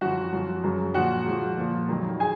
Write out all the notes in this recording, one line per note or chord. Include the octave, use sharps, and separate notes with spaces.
F#2 F3 F#4 F#5
F#2 F3
F#2 C#3 F#3
A#2 F3 F#4 F#5
G#2 F3
A#2 F3
F2 D#3 F#3
G#4 G#5